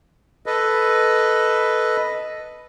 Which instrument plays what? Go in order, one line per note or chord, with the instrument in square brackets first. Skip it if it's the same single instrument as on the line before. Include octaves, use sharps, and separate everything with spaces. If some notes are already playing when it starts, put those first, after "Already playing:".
[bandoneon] A4 B4 D#5